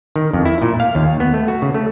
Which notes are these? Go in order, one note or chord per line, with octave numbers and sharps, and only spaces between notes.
D#3
F2
E4
A#2
F5
D#2
B3
A3
F#4
C#3
A3